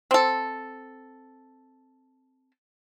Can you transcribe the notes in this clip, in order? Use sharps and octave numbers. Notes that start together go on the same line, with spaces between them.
C4 A4